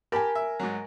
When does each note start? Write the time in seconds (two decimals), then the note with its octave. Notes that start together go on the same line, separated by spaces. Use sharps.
0.12 G4 A#4 G#5 A5 B5
0.35 E5
0.60 G#2 F#3